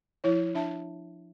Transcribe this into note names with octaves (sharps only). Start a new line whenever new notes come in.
F3 E4 C#5
D4 E5 A5